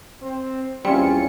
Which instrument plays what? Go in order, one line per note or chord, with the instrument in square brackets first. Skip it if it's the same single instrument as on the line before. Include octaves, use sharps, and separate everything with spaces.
[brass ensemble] C4
[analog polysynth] E2 C#4 C#7 [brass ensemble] A#2 F3 F4 [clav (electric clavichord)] G3 C4